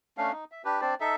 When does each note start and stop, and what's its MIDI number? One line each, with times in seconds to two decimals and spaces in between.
0.18 0.32 57
0.18 0.32 61
0.18 0.32 62
0.18 0.32 77
0.32 0.44 63
0.52 0.62 76
0.65 0.81 62
0.65 0.81 67
0.65 0.81 71
0.81 0.95 60
0.81 0.95 62
0.81 0.95 72
0.81 0.95 74
1.01 1.16 63
1.01 1.16 69
1.01 1.16 76